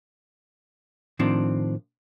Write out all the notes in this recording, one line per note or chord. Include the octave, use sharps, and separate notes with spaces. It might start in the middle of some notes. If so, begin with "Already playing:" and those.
A2 D#3 F3 C4 D4